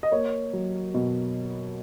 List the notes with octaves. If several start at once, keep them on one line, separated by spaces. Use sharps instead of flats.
D#5
A#3 C#5
F#3
B2